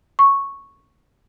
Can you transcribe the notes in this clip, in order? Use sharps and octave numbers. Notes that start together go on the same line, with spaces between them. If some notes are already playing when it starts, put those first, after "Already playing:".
C#6